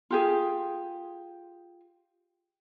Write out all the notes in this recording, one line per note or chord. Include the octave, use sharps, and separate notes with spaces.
F4 G4 G#4